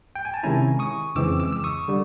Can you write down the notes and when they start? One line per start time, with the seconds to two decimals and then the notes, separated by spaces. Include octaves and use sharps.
0.15 G5
0.25 G#5
0.34 A5
0.43 C3 D#3 G#3 C#4 E4 G#5 A#5
0.79 C#6 D#6
1.15 F2 C#3 E3 G#3 C4 D6 E6
1.40 D6 E6
1.53 E6
1.64 C#6 D#6
1.88 D3 G3